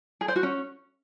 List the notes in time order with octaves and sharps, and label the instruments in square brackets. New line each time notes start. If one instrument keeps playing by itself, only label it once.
[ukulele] G#4
C5
F#4
C#4